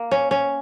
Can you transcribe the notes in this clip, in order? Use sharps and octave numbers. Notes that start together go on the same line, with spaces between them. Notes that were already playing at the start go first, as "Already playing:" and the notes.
Already playing: A#3
C#4
C#4